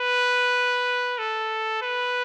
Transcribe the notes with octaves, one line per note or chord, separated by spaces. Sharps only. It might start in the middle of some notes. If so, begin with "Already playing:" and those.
Already playing: B4
A4
B4